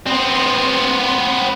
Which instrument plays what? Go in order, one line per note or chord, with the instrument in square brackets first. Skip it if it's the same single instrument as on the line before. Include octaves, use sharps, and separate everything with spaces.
[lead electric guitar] B3 C4